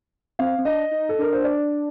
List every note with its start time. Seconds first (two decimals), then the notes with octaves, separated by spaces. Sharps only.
0.39 C4 F5
0.58 C4
0.65 D4 D#5
0.91 D#4
1.09 A4
1.19 D4 A#4
1.33 C5
1.44 D5